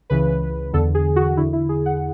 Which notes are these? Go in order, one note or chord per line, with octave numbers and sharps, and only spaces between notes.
C#2 C#3 E3 B4
E2 D3 A4
G#4
F#4
E2 D3 E4
E4
G#4
F#5